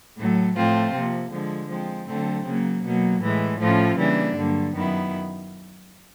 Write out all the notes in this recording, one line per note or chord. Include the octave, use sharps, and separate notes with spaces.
A2 F#3 A3
A2 F3 A3 C4 F4
C3 F3 A#3
D3 F3 G#3
F3 G#3 C4
D3 F#3 A3 C4
C#3 F#3 A#3
B2 F#3 A#3
A2 E3 G#3
A2 F3 A3 C#4 F4
C#3 E3 G3 A#3 D4
G2 D3 F#3 A#3
F#2 D#3 F#3 B3 E4